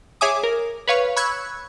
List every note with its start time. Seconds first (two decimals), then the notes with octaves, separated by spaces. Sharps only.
0.21 G#4 C#5 E5 G#5 D6 D#6
0.43 A#4
0.88 B4 C#5 F5 C#6
1.16 B5 C#6 E6 F#6 G#6